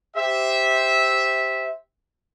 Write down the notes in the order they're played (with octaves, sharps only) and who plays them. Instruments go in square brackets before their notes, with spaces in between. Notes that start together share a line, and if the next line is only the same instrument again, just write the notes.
[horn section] G4 C5 E5